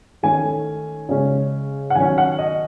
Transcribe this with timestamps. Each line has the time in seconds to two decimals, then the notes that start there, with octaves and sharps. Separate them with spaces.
0.23 D#3 A3 C#4 G#5
1.09 C#3 G#3 C#4
1.90 F#5
1.95 D#3 F#3 C#4 G#5
2.18 F#5
2.39 D#5